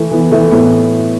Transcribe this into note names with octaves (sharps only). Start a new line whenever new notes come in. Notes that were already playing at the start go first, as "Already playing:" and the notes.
Already playing: E3 A3
E3 B3
E3 A3
A2 B3